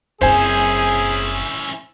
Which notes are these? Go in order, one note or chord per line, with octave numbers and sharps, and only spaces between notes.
F#1 C4 C#4 E4 G#4 C5 G#5